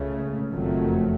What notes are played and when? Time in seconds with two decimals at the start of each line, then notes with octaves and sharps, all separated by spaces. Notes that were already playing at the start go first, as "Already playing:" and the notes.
Already playing: C#2 C#3 A3
0.52 F#1 F2 D#3 F#3 A3